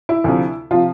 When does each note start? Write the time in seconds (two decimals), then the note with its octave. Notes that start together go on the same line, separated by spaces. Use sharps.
0.09 E4
0.24 D2 C3 F3
0.71 C3 F3 F4